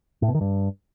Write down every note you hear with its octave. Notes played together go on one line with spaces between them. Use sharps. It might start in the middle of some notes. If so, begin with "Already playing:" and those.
A2
B2
D#3
G2